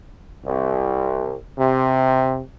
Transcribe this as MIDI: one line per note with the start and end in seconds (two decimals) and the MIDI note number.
0.45 1.35 36
1.58 2.41 48